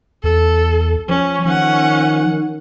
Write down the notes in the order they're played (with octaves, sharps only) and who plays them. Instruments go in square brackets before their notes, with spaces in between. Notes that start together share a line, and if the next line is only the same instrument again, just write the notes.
[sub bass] E2 [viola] A4
[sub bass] F3 [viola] C#4
[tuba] D#3 [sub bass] F3 [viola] C#4 F#5